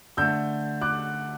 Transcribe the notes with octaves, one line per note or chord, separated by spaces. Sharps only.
D3 A3 E6 G6
D6 F#6